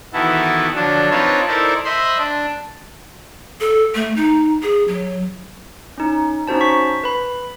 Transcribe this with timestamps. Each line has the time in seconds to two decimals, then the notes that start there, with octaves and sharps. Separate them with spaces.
0.13 D#3 E3 B3 E4 F#4 A4
0.75 D3 F3 F#3 D4
1.11 C4 D4 D#4 F4 B4 C#5
1.48 D#4 E4 A4 A#4 C5 D5
1.85 C5 D#5 E5 B5 C6
2.18 D4
3.60 A4
3.95 A3
4.16 D#4
4.63 G#4
4.88 F#3
5.98 C#4 D#4
6.48 C#4 D#4 F#4 C5 A5
6.61 C#6 B6
7.04 B4 B5